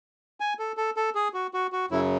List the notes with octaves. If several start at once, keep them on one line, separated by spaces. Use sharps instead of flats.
G#5
A4
A4
A4
G#4
F#4
F#4
F#4
F#2 C#3 F#3 E4